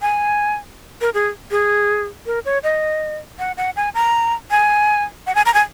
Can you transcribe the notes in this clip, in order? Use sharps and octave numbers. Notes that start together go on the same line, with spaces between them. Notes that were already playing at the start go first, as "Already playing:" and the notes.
G#5
A#4
G#4
G#4
A#4
C#5
D#5
F#5
F#5
G#5
A#5
G#5
F#5
G#5
A#5
G#5